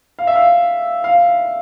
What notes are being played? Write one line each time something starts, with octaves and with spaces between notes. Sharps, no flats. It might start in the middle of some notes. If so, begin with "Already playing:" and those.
F5
E5
F5
F5